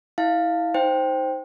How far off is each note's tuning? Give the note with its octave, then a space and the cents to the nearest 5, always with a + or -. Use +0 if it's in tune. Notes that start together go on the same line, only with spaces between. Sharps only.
E4 -30 F5 +0
D#4 +20 C5 +5 G5 +0